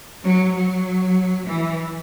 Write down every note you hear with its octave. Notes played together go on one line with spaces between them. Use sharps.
F#3
F#3
E3